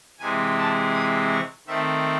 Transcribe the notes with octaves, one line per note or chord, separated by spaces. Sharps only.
C3 E3 G#3 C4 G#5
A5
D#6
C#6
D#3 A3 C4 E5